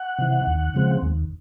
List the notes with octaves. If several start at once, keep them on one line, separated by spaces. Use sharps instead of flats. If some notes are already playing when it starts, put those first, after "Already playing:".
Already playing: F#5
C3 E3
D#2
C#3 F3 G#3 C4
D#2